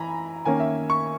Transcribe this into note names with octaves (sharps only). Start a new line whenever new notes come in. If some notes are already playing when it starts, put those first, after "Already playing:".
Already playing: E3 G#5 A#5 B5
D#3 A#3 C#4 G#5
E5
C#6